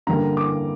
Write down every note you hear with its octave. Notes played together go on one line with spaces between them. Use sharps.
G2 D3 G3 A#3 A#5
D6